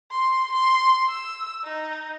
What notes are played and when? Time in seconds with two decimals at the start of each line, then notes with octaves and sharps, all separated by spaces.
0.11 C6
0.52 C6
1.10 E6
1.64 D#4